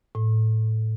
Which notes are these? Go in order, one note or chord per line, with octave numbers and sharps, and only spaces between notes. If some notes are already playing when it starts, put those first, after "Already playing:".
A2